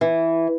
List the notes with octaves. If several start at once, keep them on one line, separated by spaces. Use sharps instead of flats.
E3